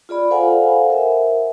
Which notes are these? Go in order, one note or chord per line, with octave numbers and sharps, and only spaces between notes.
F4 G#4 D5 B5
A4 C5 F5 F#5 G#5
A#4 E5